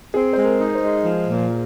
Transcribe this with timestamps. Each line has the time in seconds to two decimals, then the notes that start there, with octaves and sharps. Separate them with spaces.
0.14 C4 G#4
0.33 G#3 C5
0.44 A#4
0.60 D#4
0.75 C5
0.82 G#3
1.05 F3
1.28 A#2